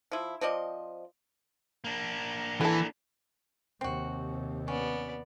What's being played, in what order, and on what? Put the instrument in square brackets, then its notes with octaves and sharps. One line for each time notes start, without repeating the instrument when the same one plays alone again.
[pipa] F3 E4
F3 C4 D5 D#5
[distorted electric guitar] A#3 D4
[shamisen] D3 A4 [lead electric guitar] E3
[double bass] D#2 C3 [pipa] C4 F#4
[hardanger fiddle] B3 D5 [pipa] C#4